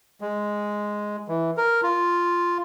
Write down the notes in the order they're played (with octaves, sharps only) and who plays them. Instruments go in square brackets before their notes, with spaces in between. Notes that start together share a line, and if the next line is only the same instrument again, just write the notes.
[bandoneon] G#3
E3
A#4
F4